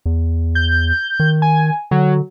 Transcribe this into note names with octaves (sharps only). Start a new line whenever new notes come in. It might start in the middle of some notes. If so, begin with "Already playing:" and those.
E2
G6
D#3
G#5
D3 F#3